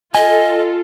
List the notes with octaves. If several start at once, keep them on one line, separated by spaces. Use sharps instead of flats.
F4 A4 D#5 G#5